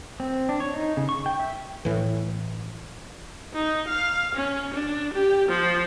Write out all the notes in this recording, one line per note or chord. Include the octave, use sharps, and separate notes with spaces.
C4
D4
C#5
D#4
C#3
C#6
G5
E5
A2 E3
D#4
F5
C#4
D4
G4
F3